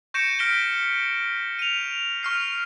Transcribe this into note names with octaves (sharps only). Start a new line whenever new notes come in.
C#6 G6 A#6 C#7 D7 E7
F6 A#6 B6 D7 E7 G7
D#7 F7
C#6 F6 C7